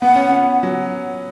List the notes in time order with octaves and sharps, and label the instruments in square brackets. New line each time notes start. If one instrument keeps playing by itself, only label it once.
[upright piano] B3 [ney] F#5
[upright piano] C#4
B3
F#3